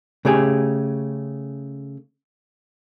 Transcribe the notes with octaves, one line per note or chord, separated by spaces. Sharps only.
C#3 A3 G4 G#4